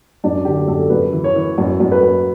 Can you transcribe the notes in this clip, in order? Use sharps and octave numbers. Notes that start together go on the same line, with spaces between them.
F#2 D4
D3 G4
F#2 A4
F#2 B4
E3
C#5
E3
F#2
F#2
B4
F#2